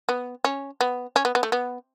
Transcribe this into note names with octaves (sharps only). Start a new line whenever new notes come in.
B3
C#4
B3
C#4
B3
B3
A3
B3